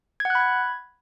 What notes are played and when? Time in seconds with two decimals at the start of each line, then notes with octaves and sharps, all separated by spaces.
0.20 G#6
0.25 F#5
0.30 F#6
0.35 B5
0.40 G#6